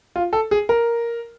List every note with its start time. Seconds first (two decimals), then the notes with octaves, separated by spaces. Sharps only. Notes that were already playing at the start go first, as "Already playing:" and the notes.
0.16 F4
0.33 A4
0.51 G#4
0.69 A#4